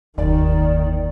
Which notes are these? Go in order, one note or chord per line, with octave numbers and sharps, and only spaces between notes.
F#1 D#2 D#3 D5